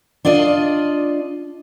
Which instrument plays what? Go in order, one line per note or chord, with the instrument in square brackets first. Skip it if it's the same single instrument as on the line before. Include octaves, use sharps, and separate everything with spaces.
[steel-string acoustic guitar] D4 F4 D5 D#5